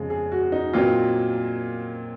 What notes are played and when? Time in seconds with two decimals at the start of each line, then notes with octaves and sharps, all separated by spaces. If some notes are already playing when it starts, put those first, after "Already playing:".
Already playing: F2 C#3 G#3 G#4
0.10 G#4
0.32 F#4
0.52 D#4
0.73 A#2 F#3 C4 D#4 F4